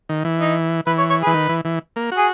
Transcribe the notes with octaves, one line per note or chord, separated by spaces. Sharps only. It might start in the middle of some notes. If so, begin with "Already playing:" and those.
D#3
E3
D#4
E3 B4
C#5
C#5
E3 G#4 B4
D#3
E3
E3
A#3
F#4
G#4